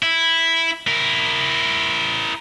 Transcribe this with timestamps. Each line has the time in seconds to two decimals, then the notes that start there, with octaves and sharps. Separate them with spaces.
0.02 E4
0.87 E4 A#4